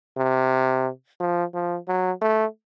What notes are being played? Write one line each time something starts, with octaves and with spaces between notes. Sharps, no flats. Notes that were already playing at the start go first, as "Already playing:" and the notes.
C3
F3
F3
F#3
A3